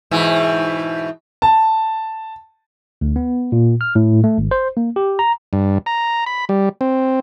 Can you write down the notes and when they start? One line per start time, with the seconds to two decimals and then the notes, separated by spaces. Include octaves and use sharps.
0.11 G#2 B2 E3
1.42 A5
3.01 D2
3.16 B3
3.52 A#2
3.81 F6
3.95 A2
4.24 A3
4.38 G#1
4.51 C5
4.77 A#3
4.96 G4
5.19 A#5
5.53 G2
5.86 A#5
6.26 B5
6.49 G3
6.81 C4